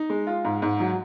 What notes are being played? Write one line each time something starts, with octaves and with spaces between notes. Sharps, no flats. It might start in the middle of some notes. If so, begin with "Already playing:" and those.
Already playing: D#4
G#3
F4
G#2
G#2
F#3